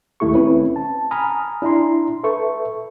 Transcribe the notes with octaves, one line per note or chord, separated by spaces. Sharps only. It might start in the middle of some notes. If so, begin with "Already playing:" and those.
D2 D#3 A3 E4 G4 C#6
C4 C#4 E4 B4
A5
G#5 A#5 B5 D#6 F6
D4 E4 A#5 C6
A4 B4 E5 C#6